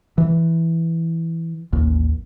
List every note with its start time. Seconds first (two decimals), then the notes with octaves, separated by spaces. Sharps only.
0.18 E3
1.73 A1 D#2